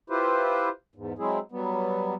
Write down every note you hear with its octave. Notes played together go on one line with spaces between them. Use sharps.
E4 F4 G4 B4 C5
E2 G#2
F#3 G#3 C4 E4 G#4
F#3 G3 B3